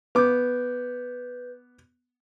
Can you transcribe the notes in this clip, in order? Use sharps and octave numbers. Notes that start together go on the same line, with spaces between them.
B3 B4 D6 G6